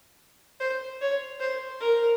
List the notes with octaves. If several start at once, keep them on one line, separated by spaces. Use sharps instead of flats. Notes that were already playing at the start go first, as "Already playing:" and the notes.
C5
C#5
C5
A#4